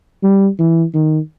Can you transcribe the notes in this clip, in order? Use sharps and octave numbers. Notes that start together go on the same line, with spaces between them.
G3
E3
D#3